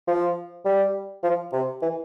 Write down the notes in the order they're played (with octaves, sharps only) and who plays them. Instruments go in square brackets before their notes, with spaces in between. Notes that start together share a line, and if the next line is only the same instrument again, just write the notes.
[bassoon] F3
G3
F3
C3
E3